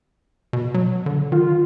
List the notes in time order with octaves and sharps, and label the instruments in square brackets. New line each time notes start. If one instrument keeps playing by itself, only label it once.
[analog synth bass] B2
F#3
D3
[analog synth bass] D#3 [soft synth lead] F4